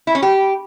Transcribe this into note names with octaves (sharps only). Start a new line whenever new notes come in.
E4
C#4
G4